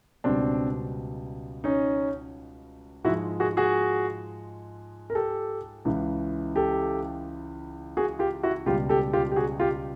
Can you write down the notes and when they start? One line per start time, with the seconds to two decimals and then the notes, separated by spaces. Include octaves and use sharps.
0.24 C#2 B2 G3 C4 D4
1.64 C#4 D#4
3.04 G#2 F3 G#3 E4 F#4
3.40 F#4 G#4
3.57 F#4 G#4
5.10 A#4
5.15 G4 A4
5.85 C#2 C#3 E3
6.56 G4 A4
7.97 F#4 G#4
8.19 F4 G4
8.43 E4 F#4
8.66 C#2 B2 G3 F4 G4
8.89 G4 A4
9.13 F4 G4
9.32 G4
9.36 F#4 G#4
9.60 F4 G4